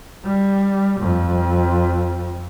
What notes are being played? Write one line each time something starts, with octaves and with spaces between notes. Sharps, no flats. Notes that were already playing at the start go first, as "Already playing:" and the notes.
G3
F2